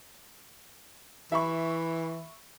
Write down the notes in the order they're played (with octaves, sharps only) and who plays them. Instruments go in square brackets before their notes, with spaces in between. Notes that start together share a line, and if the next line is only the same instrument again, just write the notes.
[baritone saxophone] E3 [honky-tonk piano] E5 B5 C#6